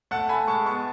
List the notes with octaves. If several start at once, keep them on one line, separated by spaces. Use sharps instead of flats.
A3 F#5 A5
A3 G#5 B5
G#3 A5 C#6
B3 A5 C#6